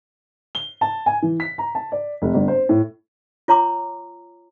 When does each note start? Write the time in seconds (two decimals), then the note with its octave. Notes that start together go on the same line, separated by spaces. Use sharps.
0.55 G7
0.81 A5
1.06 G#5
1.22 E3
1.40 B6
1.58 A#5
1.75 A5
1.92 D5
2.22 F1
2.34 G1
2.48 C5
2.69 A2
3.48 F4 C#5 A#5 C6 D6